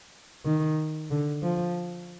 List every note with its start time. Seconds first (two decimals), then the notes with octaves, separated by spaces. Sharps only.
0.45 D#3
1.10 D3
1.43 F3